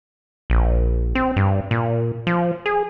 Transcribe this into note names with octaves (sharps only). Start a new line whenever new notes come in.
A#1
C4
G2
A#2
F3
G#4